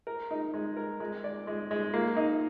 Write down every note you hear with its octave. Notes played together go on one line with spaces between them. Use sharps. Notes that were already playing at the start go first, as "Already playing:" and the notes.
A#4
D#4
G#3
A#4
G#3
D5
G#3
G#3
A#3
D#4